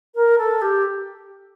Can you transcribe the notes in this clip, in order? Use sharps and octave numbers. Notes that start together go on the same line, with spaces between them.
A#4
A4
G4